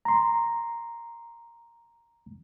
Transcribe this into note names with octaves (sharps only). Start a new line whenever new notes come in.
A#5 C6